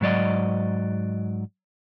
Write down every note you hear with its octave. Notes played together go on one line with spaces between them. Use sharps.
G#2 F#3 D5 D#5